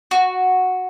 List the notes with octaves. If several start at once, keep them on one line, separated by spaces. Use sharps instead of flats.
F#4